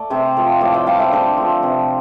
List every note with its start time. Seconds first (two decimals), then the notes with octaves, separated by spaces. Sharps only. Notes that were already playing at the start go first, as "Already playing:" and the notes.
Already playing: A3 D5
0.10 C3 C5 E5
0.37 F3 A3
0.61 A2 D5 F5
0.74 E5 G5
0.86 G3 F5 A5
0.99 C5 E5
1.12 D3 A4 C5
1.38 F3 A3
1.63 C3